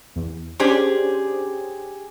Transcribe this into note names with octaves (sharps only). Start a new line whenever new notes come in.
E2
C#4 D4 G4 G#4 C5